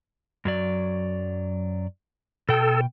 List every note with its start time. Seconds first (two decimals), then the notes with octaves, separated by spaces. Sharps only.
0.45 F#2 F#3 D5
2.49 B2 A4 G5